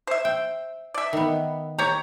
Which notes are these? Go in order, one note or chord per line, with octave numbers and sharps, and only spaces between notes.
C5 E5
G5
D5 E5
D#3 B3
G4 C#5 A#5